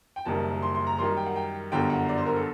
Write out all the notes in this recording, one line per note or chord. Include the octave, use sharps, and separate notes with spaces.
G5
F#1 F#2 D#3 G3 A5
C6
C6
A#5
F#2 D#3 G3 C6
G5
F#5
G5
G1 F#2 D3 G3 G5
F#5
D5
C5
A#4
A4